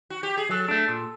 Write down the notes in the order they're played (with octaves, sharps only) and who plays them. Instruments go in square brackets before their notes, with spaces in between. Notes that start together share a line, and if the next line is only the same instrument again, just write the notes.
[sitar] F#4
G4
G#4
[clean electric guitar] F#3 [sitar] A4
[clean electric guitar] A3 D4
A#2